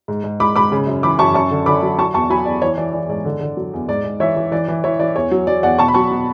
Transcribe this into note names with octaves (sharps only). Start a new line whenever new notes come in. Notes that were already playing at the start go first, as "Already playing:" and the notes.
G#2
G#2
G#2 B5 D6
G#2 B5 D6
C#3
F#2
E3 B5 D6
F#2 A5 C#6
F#2 A5 C#6
D3
D3 B5 D6
F#3
F#3 A5 C#6
E2 A5 C#6
F#3 G#5 B5
E2 D5
E3 C#5
E3 D5
E3 D5
G#2 D5
D3
D3
F#3
E2
G#2 D5
G#2
E3 C#5 E5
E3
E3 D5
E3
E3 C#5 E5
E3 D5
E2 C#5
F#3
F#3 D5
E2 D5 F#5
B2 A5 C#6
B5
F#3 A5 C#6
B2